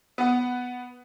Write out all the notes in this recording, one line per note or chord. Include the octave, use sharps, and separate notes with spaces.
B3 F#5